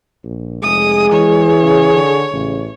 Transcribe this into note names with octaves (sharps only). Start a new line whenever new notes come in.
A#1
F1 G#3 G#4 D#6
E3 C#5
C#3
D3
A1 C#3